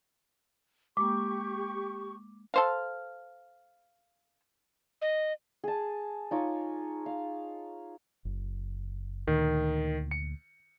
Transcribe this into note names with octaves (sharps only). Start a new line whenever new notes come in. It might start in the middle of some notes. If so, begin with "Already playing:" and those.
G#3 A#3 G4 C#6 D6
A4 C5 F5
D#5
G#4 A5
D#4 F4 C#5 D6
F5
F#1
D2 A#2 D#3
C#7